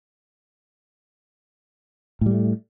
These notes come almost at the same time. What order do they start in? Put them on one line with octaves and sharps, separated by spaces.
A2 G3 A3